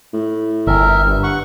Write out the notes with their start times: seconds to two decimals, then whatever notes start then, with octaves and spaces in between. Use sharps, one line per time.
0.13 A2
0.67 G1 A#4 E5
1.06 G2
1.23 F#5 C#6